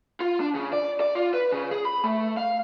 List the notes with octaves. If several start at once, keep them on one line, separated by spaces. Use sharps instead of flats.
F4
D4
C#3
D5
D5
F4
B4
C#3
G#4
B5
A3
F5